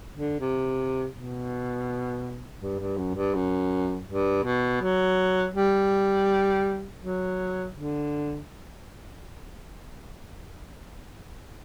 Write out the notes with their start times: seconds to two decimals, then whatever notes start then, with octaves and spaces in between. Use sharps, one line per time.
0.16 D3
0.40 C3
1.14 B2
2.61 G2
2.79 G2
2.97 F#2
3.15 G2
3.34 F#2
4.07 G2
4.44 B2
4.81 F#3
5.54 G3
7.01 F#3
7.75 D3